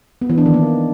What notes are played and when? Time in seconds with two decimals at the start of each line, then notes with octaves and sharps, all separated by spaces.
0.22 B3
0.30 E3
0.38 D4
0.46 D#3
0.54 A#3